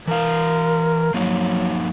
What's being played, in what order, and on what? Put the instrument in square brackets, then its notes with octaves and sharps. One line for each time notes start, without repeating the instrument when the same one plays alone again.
[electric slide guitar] E3 F5 [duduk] A#4
[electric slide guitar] F3 A#3 D#4 [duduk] F#3